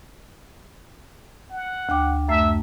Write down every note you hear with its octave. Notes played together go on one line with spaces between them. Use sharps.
F#5
D2 G5 D6
F#2 A3 E5